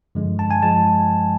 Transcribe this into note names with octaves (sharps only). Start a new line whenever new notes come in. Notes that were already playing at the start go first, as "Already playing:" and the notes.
G2 D3 F3 G#3
A5
G#5
F3 G#3 A5